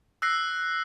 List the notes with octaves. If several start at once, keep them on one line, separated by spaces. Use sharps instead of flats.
E6 F#6 A#6 C7